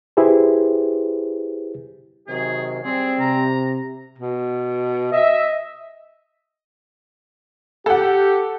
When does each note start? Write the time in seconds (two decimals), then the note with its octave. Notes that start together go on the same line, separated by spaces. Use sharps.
0.17 E4 G4 G#4 B4 C5
2.28 C3 D#3 F#3 G#4
2.84 G3 C4 G#4
3.20 C3 A#5
4.18 B2
5.12 D#5 E5
7.86 G4 A4 F#5